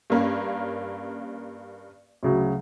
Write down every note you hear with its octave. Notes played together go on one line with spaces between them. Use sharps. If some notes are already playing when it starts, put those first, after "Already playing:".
G2 A#3 C#4
D2 C#3 F#3